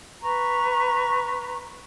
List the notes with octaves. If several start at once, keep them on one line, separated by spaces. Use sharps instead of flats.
B4 A#5 C#6